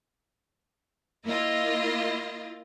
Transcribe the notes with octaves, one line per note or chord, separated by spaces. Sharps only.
A#3 E4 F4 D#5